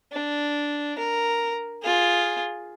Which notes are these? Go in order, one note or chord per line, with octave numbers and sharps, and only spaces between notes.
D4
A#4
F4 G#4